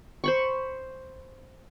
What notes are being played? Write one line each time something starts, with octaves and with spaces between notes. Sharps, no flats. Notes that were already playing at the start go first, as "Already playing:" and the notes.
C5 B5 C#6